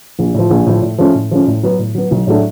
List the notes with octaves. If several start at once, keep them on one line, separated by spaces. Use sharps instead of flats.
A#1
A2 F3
A#1
A2 F3
A2
F3 A3 C#4
A2
F3 A3 C#4
A2
F#3 B3
A2
F#3 B3
B1
A2 F#3 A3 D4